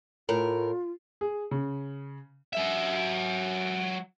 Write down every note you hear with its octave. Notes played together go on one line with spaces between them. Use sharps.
A2 F4 A#4
G#4
C#3
F#3 E5